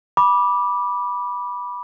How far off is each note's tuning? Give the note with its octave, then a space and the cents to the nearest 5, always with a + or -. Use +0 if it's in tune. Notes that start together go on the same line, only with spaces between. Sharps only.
B5 -15 D6 +0